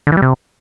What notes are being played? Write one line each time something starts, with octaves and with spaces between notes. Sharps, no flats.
D3
E3
G3
C3